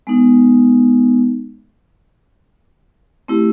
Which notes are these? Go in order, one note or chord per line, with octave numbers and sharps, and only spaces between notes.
G#3 B3 D#4
A3 C4 E4 G4